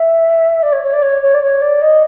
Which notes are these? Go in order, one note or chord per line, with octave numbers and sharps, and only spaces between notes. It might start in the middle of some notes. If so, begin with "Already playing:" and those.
Already playing: E5
D5
C#5
C#5
D5
C#5
C#5
D5
C#5
D5
D#5